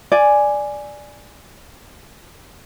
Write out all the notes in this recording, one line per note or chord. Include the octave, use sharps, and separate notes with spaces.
D5 G#5